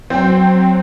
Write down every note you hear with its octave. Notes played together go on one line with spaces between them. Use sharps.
F#3 C4 G5